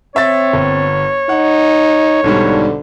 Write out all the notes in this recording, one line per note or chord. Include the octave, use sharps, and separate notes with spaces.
C4 C#5 E5 A6
G1
D#4 F#5
B1 G#2 D3 G3